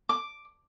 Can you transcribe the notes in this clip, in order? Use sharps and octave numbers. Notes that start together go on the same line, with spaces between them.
D6